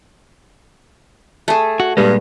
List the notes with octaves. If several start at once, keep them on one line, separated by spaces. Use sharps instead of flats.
A3 G#4
F#4
G2 A#2 G3 G#3